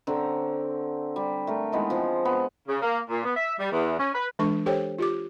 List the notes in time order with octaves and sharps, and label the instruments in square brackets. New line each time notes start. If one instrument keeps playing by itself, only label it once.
[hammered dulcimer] D3 C4 C#5 A#5
G3
A3 A#4
D#3 E3 G#3 B3
F3 C4
B3
[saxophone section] C#3
A#3
A#2
B3
E5
G3
E2
C#4
B4
[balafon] E3 G#3 D4 A4 C#6
G4 A4 C5 C#5 G5
F4 G4 D6